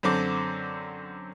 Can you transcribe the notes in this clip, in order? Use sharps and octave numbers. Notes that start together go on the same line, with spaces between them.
F#2 D3 C4 A4 C6 D6